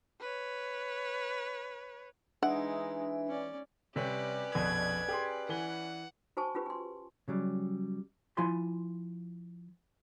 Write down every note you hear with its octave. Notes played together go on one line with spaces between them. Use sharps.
B4 C#5
E3 G#3 D4 D#4 E5 F#5
C#4 D5
C3 G3 C#4 G4 B4 C#5 D5
A#1 F2 B2 G#6
G4 G#4 C6
E3 F#5 G#5 G7
F#4 C5 G#5 A5 C#6
C#4 F4 G4 B4
G#5 C6
C#3 F#3 G3
F3 E4 F4 G#5 B5 C6